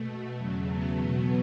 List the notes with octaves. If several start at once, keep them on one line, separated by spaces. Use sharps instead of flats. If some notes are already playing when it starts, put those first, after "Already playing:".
Already playing: B2 A3
E2 C#3 F#3 A3
B3
E2 B2 F#3 A3 B3